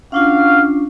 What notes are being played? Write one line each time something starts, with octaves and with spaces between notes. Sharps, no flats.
C#4 D4 F4 F#4 F5